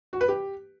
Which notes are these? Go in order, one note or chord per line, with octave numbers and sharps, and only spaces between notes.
F#4
B4
G4